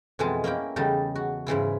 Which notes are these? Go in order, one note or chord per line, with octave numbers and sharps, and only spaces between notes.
F2 B2 E3 G#3 G#4 A5
A#3 C#4 E4 G5
E2 C#3 G3 D#4 A4
F#4
G#2 C#3 E3 E4